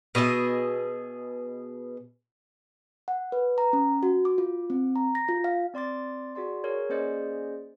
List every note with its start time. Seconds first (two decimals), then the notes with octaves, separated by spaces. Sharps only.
0.15 B2 G#4 D#5 E5
3.08 F#5
3.32 B4
3.58 A#5
3.73 C#4
4.03 F#4
4.25 D6
4.38 F4
4.70 C4
4.96 A#5
5.15 A#6
5.28 F4
5.44 F5
5.74 C4 D5 C6 D6 A6
6.35 F#4 G#4 D5 C6
6.64 G#4 A#4 C#5
6.89 A#3 C#4 G#4 C5 D5 D#5